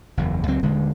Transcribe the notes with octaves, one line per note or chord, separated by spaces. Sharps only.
F#1 E2
C#2 F#3 C4
D#1 D3 G#3